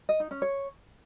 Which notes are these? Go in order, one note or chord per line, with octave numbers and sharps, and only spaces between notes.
D#5
D#4
C#4
C#5